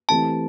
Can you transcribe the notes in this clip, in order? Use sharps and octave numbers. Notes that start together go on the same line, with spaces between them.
E3 A3 C4 G4 A5